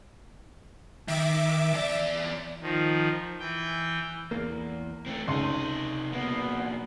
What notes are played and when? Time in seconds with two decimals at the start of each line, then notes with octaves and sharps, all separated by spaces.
1.08 D#3 E5 D6
1.74 E2 D5
2.62 D#3 F3
3.39 E3 G5
4.31 E2 A#3
5.06 A3 C4
5.28 C#2 C3 D#4 C6
6.12 B1 A#3 B3